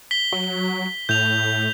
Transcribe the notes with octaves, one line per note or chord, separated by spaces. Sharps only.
B6 G7
F#3
A2 G6 F7